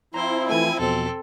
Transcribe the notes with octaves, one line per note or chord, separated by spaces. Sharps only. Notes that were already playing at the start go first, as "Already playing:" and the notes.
F3 C4 E4 C5 A#5
E3 A3 G#5
E2 B2 F3 C4 A4